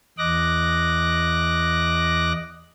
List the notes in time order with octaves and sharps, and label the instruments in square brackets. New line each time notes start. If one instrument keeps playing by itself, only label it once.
[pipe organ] E2 D#5 D6 F#6 A#6